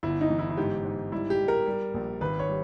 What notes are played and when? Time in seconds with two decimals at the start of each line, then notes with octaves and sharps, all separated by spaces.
0.03 G1 E4
0.21 D#4
0.30 E3
0.39 E4
0.50 E4
0.57 G#2 G4
0.85 G#2
1.12 G3 E4
1.30 G4
1.40 G3
1.48 A#4
1.66 G3
1.94 A#1
2.21 G#1 B4
2.39 C#5
2.48 G3